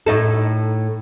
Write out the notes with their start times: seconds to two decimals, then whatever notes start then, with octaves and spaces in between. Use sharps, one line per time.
0.06 A2 D#4 A4